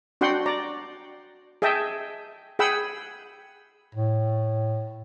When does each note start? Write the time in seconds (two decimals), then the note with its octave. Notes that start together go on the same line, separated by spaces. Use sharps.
0.21 D4 F#4 F#5 G5 C6
0.46 D5 A#5
1.62 G#4 D#5 E5 G5 A5
2.59 G#4 F#5 G5 B5 E6
3.95 A2